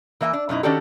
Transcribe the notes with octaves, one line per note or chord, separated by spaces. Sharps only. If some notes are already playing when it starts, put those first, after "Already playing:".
E3 A#3 E5 F5 G#5
D4
F#2 B2 D#4 E4
D#3 C#4 D4 F#4 G4 A4